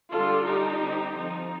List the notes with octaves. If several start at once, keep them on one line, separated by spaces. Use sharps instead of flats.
D3 G3 D4 F4 A4
G3 D4 D#4 G4
D3 G3 C4
F3 C4 D#4